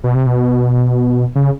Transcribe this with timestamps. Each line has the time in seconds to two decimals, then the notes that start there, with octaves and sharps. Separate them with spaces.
0.04 B2
0.15 C3
0.26 B2
1.35 C#3